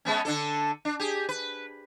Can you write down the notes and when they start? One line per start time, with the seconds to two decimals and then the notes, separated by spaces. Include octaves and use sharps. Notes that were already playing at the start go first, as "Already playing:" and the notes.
0.05 G#3 B3 C#4
0.25 D3 D4 A4
0.85 D4
1.00 G4 G#4
1.29 B4